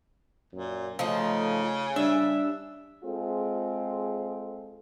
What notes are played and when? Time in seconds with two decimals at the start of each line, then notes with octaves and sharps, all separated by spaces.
0.53 F#2 A#2
0.99 C#3 F3 A3 D#4
1.96 G3 D4 E5
3.04 G#3 C4 F4 G#4 A4